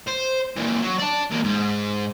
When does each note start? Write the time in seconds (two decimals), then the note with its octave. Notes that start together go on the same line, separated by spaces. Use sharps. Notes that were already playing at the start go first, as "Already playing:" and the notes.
0.08 C5
0.57 A#2 E3
0.83 F#3
0.99 D5 A5
1.31 E2 A#3
1.44 G#2